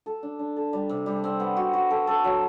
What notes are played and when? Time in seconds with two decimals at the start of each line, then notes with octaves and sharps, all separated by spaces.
0.06 A4
0.23 D4
0.39 D4
0.56 A4
0.73 G3
0.89 C3
1.06 G3
1.24 C4
1.40 B3
1.56 F#4
1.73 F#4
1.90 A4
2.07 A4
2.24 F#3